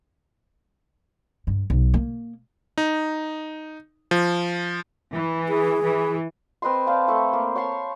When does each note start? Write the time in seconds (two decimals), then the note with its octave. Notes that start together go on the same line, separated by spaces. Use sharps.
1.47 G2
1.70 B1
1.94 A#3
2.78 D#4
4.11 F3
5.12 E3
5.49 G#4
5.82 E3
6.62 C4 B4 D#5 C6
6.87 D5 F5 G5 A5
7.08 A3 A4
7.33 A#3
7.55 C#5 A5 C6 C#6